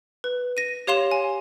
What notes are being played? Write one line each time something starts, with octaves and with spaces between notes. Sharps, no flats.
B4
A#6 D#7
G4 C#5 F5 C6 E7 F7
G#5